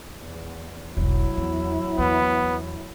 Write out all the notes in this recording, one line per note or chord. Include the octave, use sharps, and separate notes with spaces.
E2
E1 B1 F#3 E4
E2
E2 B3